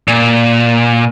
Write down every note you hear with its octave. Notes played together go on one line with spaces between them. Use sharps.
A#2